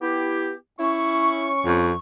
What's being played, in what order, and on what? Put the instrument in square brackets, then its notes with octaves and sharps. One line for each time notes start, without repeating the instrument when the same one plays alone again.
[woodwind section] B3 E4 G4
[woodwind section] C#4 C#6 [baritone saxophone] E4
[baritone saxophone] F2